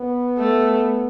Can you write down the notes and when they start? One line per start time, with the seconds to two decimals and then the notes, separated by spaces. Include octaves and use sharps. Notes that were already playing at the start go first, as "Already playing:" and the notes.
Already playing: B3
0.39 A3